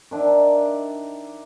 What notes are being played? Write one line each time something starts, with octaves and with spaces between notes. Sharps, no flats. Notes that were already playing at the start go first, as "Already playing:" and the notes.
D#3 D4 E5